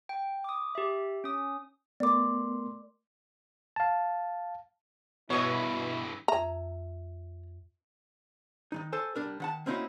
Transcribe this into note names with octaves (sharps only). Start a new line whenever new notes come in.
G5
D6 D#6
G4 E5
C#4 D#6
A3 B3 A#4 D5 C6 D6
F5 A5
G2 B2 E3 E4 C#5 C#6 D#6
F2 E5 A#5
D#3 E3 D#4
A4 C5 G#5
C2 F#3 G3 D4 A#4
D#3 F#5 A5
A#3 C4 C#4 D#4 E4 F#4